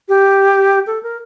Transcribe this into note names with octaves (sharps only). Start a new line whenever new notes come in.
G4
A4
A#4